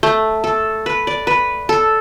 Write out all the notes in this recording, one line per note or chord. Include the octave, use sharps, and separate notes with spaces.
A3
A4
B4
D5
B4
A4